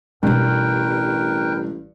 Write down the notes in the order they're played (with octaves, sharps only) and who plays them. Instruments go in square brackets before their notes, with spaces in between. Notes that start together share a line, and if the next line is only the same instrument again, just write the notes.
[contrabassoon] A1 [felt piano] G2 [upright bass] B2 D#4 [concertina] A#4 B4 G5